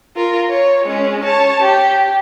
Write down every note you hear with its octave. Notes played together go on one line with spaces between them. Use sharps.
F4 A#4
C#5
G#3 C#4
C#5 A5
G4